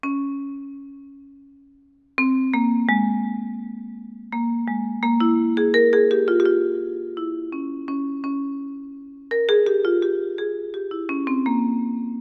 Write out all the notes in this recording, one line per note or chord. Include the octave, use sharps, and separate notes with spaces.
C#4
C4
A#3
G#3
A#3
G#3
A#3
E4
G#4
A#4
G#4
G4
F4
G4
F4
E4
C#4
C#4
C#4
A#4
G#4
G4
F4
G4
G#4
G4
E4
C#4
C4
A#3